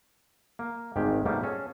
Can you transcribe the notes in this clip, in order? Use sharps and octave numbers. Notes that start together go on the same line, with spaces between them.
A#3
G#1 D2 D#3 G#3 G4
G#2 B2 G3 A3 A#3
C#4 G#4 A4